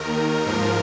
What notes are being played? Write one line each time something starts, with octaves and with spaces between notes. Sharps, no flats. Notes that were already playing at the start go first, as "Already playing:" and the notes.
Already playing: D#2 D#3 A#4
G#2 F3 A#4